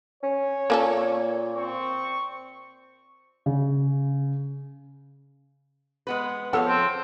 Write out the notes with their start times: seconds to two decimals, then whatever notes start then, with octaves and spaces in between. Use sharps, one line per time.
0.23 C#4 C#5
0.70 A#2 A#3 C#4 A4
1.55 C4 C#6
3.46 C#3
6.07 G#3 B3 B4
6.53 F3 B3 A4 C#5 F5
6.67 C4